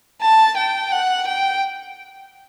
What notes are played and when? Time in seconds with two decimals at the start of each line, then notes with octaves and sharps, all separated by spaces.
0.22 A5
0.57 G5
0.92 F#5
1.28 G5